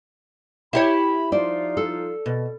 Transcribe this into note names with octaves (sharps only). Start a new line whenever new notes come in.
E4 G4 C#5 B5
F3 D#4 F4 C5 D5
A4
B2